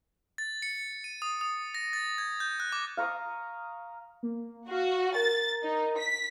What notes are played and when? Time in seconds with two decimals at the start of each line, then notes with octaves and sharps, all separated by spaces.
0.38 A6
0.62 C#7
1.04 D#7
1.22 D#6
1.41 D#6
1.75 A#6
1.93 A6
2.18 G#6
2.40 G6
2.60 F#6
2.72 D6
2.97 F5 A#5 C#6 D#6
4.23 A#3
4.69 F#4 F5
5.15 A#4 A6
5.63 D#4
5.98 B6